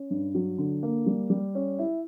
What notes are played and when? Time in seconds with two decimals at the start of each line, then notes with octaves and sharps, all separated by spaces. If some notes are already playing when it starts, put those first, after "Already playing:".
Already playing: C#4
0.11 G2
0.35 F#3
0.58 D3
0.83 A#3
1.06 G3
1.30 G3
1.55 C#4
1.79 E4